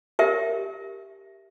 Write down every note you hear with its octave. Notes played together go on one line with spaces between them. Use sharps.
G4 A#4 E5